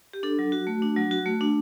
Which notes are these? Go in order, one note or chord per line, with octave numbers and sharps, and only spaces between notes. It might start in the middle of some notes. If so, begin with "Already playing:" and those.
G4
D4 A4
F#3
F#4
A3
D4
F#3
F#4
A3
D4